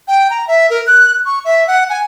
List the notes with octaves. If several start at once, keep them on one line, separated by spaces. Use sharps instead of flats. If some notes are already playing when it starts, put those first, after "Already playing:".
G5
A#5
E5
A#4
F#6
C#6
E5
F#5
G#5